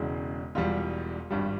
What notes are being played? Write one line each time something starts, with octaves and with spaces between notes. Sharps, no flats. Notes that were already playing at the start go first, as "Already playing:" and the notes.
Already playing: E1 E2 C#3 E3 G#3
E1 E2 E3 G3 F4
G#1 G2 G3